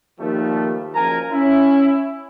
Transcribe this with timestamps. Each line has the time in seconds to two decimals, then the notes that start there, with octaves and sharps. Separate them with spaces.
0.20 D#2 F3 G3 A3
0.95 F#1 F3 A#4 G#5 A#5
1.32 C#4 E4